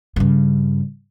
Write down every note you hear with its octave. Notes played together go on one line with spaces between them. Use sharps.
G2 C#3